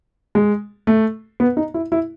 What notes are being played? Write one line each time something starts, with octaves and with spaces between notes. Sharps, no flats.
G#3
A3
B3
D#4
E4
E4